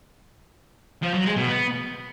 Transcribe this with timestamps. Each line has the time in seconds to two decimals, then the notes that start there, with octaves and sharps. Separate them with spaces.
1.03 F3
1.14 F#3
1.25 G#3
1.37 B2
1.48 B3